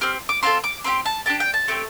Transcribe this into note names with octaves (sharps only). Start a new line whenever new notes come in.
C4 G4 F6
D6
C4 F4 A4 C6
D6
C4 E4 G4 C6
A5
D4 G4 A5
G5
A5
A3 C4 G4